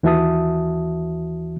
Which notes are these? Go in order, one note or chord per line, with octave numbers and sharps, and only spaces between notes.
D#2 E3 F#4 E5 A5 D#6